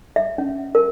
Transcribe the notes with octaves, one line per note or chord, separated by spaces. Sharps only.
E5
C#4
A#4